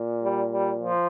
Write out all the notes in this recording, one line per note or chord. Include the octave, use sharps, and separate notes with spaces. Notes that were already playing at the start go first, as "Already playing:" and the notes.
Already playing: A#2
G3
G3
F3